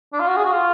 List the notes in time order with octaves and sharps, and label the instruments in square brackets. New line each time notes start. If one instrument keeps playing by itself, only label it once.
[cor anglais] D4
F4
F#4
G#4
F#4
F4